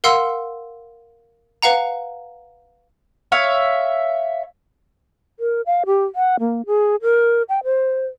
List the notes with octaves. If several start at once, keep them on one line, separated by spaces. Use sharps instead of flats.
A#4 F5 F#5 C6 E6
B4 F5 F#5 A#5
C#5 E5 F5
A#4
F5
G4
F#5
A#3
G#4
A#4
G5
C5